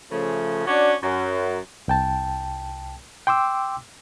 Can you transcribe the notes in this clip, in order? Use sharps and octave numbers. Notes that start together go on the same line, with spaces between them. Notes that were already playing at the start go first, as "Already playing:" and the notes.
C#3 F3 A3
C#4 D4 F#4 D5
F#2
C2 G5 A5
G5 C6 D6 E6